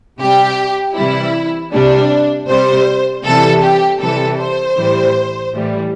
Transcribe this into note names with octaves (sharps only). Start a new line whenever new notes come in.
C3 G3 G4
C3 E3 G3 E4
C3 G3 D4
C3 G3 C5
C3 E3 G3 A4
G4
C3 E3 G3 A4
C5
A2 E3 G3
A2 E3 G3